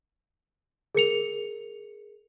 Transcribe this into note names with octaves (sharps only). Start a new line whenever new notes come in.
G#4 A#4 C#7 F7